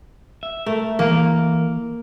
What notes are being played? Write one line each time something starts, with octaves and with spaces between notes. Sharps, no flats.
E5
A3 A#4
E3 A#3 A#4